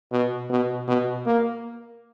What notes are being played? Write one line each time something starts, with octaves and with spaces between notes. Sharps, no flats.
B2
B2
B2
A#3